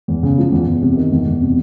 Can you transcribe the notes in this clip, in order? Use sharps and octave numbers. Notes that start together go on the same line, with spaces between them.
E2
C#3
F3
E2
E2
C3
D#3
E2
E2
C3